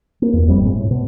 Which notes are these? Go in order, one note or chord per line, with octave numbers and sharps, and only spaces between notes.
A#3
E2
F1 F2 G3 C4
G2 A#2 G#3
A2
B2